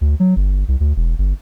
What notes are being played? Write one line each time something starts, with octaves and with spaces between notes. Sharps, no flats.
D2
F#3
G1
C2
D2
E1
G1